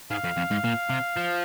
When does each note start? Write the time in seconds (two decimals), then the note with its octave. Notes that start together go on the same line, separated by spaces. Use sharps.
0.10 G#2 F5
0.24 F2
0.37 F2
0.51 G#2
0.64 A#2
0.90 C3
1.17 F3